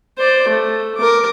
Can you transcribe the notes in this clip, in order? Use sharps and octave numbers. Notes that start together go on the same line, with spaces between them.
C5 D5
A3
A#4 D6